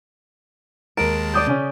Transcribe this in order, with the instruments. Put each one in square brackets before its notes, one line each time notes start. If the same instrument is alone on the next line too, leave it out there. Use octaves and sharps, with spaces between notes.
[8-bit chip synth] D#2 G#3 A5 [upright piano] A#4 [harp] D7
[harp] D5 D#6 G6
[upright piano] C#3 C#4